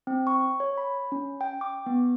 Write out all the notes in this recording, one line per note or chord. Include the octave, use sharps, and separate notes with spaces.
C4
C#6
C#5
B5
C#4
G5
D6
B3